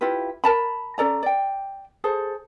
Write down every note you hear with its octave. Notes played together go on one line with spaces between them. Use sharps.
E4 F4 G4 B4
A#4 A5 B5
C#4 A4 D5 A#5
D5 G5
G#4 A4 C5